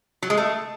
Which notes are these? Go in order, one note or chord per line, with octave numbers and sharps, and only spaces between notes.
F#3
G#3
A3